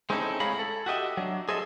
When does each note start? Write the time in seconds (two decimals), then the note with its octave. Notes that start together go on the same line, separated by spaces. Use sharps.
0.10 G#3 C4 C#4 D#4 E4 A4
0.40 A2 G#4 C#5 F5 A#5 B5
0.59 A4
0.86 F#4 G4 D#5 E5
1.17 F#3 D4
1.49 G#4 A4 C5 D#5 E5